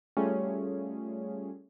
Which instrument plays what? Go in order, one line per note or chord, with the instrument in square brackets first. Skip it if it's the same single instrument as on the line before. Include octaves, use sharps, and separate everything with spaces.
[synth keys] G3 A3 C#4 F4 G#4